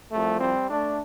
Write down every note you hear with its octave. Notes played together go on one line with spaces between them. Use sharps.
C2 C3 F3 A3
G3 C4
A3 D4